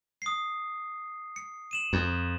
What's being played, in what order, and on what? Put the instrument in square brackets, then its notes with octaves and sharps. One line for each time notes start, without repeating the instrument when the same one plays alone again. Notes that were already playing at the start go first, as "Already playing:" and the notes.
[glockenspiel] D#6 C7
C#7
D#7 E7 F#7
[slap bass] F2